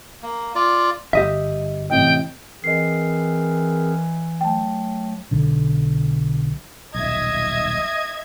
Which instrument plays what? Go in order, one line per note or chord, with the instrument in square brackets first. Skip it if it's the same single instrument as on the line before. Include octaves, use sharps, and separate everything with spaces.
[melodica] A#3
F4 D5
[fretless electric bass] G1 [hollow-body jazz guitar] G4 D#5 E5
[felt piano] A1 C3 D#5 [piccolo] G5
[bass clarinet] E3 [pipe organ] C4 G#4 A#4 [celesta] D#5 C7
[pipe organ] F#3 A3 [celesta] G5 A5
[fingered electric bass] B1 D3
[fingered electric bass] D#1 B1 [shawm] D#5 [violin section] E5 G#6